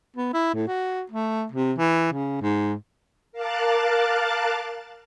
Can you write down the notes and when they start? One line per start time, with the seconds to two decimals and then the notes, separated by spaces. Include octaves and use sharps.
0.16 B3
0.34 E4
0.54 A2
0.68 F#4
1.11 A3
1.51 C3
1.78 E3
2.12 C#3
2.41 G#2
3.32 A#4 F5 A5 D6 F#6 A6